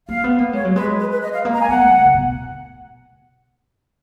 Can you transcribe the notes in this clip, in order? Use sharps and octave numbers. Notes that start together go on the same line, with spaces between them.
A#3 F5
B3
A#3
G#3 C#5
F#3
G#3 B4
B4
B4
D#5
F5
A#3
A#5
G#5
B3 F#5
C#3
C#3
B2